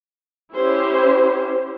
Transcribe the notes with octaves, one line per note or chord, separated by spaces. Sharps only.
C#4 E4 G4 C5